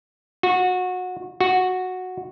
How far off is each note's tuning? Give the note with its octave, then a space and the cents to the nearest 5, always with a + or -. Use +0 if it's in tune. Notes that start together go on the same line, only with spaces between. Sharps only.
F#4 -20
F#4 -5